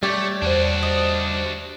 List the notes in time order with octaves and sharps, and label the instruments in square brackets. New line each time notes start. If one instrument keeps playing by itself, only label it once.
[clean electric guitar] G3 [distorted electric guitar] A3 [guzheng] G4 C#5 D5
[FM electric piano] E2 C5 [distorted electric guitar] D4 F#4
[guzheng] D#5